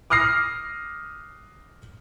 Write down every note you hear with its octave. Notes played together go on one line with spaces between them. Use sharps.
D6 D#6 F6 A#6 C7